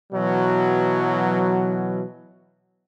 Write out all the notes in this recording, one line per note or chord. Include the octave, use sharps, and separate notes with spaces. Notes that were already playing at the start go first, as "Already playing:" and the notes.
B2 E3 F#3